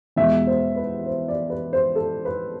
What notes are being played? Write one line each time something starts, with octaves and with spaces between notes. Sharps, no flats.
E2 B2 G#3 E5
C5
B4
C5
D5
B4
C5
A4
B4